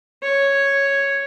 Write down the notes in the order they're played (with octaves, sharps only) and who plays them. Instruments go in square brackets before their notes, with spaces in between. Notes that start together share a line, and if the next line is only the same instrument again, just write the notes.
[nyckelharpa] C#5